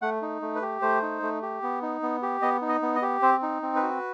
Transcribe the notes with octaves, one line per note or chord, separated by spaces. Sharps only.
A3 F#5
D#4
A3
B4
G4
A3 C5
D#4
A3
G4
B3
D#4
B3
G4
B3 D#5
D#4
D#5
B3
D#5
G4
C4 C5
D#4
C4
B4
F#4